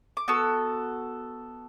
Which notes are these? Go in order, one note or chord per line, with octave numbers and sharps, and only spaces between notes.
D6
B3 F#4 A4 E6